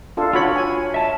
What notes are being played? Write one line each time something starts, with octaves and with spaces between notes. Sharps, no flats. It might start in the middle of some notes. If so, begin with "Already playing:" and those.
D4 F4 A4
F4 F#4 C#5 B5
G#5
E5 A5